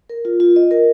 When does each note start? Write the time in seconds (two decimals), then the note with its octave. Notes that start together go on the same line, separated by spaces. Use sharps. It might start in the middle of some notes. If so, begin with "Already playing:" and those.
0.10 A#4
0.25 F4
0.40 F4
0.56 D#5
0.71 A#4